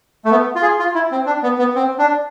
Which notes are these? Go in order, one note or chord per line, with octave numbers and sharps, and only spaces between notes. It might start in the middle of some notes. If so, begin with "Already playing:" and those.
A3
B3
F4
G#4
F4
E4
C4
D4
B3
B3
C4
D4